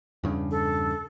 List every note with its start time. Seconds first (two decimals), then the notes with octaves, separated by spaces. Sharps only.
0.23 E2 G2 C#3
0.51 A4